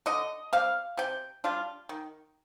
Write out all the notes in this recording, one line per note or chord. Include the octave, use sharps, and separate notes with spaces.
D3 D#5
G3 C4 F5
C3 G5
G3 D4 F4
D#3